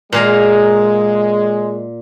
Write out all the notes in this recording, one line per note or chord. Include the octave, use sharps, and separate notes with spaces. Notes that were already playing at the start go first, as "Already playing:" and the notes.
A#2 G#3 G#4 A#4